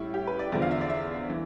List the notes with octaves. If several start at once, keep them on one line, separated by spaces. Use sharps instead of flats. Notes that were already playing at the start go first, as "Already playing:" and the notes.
Already playing: A2 G3 E4
G4
B4
D5
E2 D3 F3 D5
F5
E5
D5
E5
E3